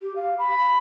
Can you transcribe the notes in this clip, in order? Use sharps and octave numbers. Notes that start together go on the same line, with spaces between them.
G4
F5
B5